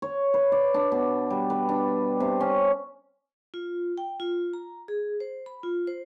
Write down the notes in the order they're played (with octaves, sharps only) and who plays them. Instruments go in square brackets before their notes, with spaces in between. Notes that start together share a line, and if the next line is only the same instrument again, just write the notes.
[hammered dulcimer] C#5
B4
D5
D4
B2
G3
B4
D4
C3
C#4
[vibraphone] F4
G5
F4
A#5
G#4
C5
B5
F4
C5